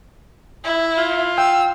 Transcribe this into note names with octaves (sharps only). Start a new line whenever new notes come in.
E4
F4
G5 E6